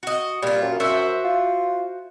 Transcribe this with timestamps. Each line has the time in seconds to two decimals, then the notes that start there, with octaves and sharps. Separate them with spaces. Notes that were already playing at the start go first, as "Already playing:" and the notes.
0.03 F#4 D#5
0.43 A#2 G3 F4
0.62 F#2
0.80 F#2 F#4 C5 E5
1.24 F4